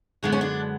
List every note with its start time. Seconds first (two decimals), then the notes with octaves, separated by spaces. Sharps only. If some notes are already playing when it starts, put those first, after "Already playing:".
0.23 F#2 D3 G#3 B3 D4
0.32 C#4
0.41 D4